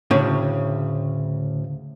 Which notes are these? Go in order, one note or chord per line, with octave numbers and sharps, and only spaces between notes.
D2 A2 C#3